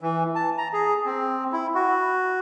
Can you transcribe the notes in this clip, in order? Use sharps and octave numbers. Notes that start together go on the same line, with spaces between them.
E3
A5
A#5
G#4
C4
E4
F#4